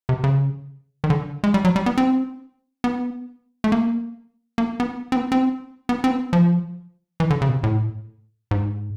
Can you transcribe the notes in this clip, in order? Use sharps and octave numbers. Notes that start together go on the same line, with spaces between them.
C3
C#3
D#3
D3
G#3
G3
F#3
G3
B3
C4
B3
A3
A#3
A#3
B3
C4
B3
C4
B3
C4
B3
F3
E3
D3
C#3
B2
C3
A2
G#2